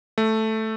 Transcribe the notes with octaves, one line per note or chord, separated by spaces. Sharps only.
A3